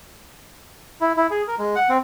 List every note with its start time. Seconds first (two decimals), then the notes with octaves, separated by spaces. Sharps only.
1.01 E4
1.17 E4
1.30 G#4
1.47 A#4
1.59 G#3
1.76 F#5
1.89 C4